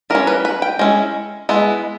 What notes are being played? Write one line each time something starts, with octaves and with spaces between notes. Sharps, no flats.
E3 G3 C#4 A#4
B4
B4
G5
G#3 C#4 E4
G#3 B3 E4